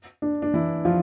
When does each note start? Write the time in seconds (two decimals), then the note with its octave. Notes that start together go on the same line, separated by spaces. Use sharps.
0.22 D4
0.42 D4
0.54 E3 E4
0.85 F3 F4